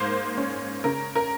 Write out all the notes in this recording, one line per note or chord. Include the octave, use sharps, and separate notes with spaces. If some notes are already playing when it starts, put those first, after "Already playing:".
Already playing: G#2 A#3 C5
C#4
C#3 A#4
A#4